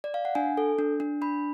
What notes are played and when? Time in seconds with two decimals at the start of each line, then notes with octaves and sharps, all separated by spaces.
0.04 D5
0.14 F5
0.25 F#5
0.35 D4 G#5
0.57 A4
0.79 D4
1.00 D4
1.22 D4 B5